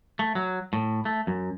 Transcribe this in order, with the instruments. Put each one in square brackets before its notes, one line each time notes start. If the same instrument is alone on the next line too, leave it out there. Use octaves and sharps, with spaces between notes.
[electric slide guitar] A3
F#3
A2
A3
F#2